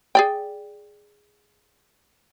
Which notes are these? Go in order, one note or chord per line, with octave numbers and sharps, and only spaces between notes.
G#4 D5 G5